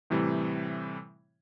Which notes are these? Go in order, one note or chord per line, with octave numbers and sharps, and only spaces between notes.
A2 C3 E3 G3